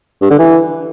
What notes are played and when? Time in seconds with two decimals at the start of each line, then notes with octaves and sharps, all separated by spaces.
0.22 G2
0.30 D3
0.39 E3